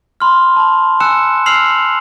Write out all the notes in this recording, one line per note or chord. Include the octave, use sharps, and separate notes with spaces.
B5 C6 F6
A5 B5
G#5 E6 F#6 C#7 E7
E6 F6 C7 F7 F#7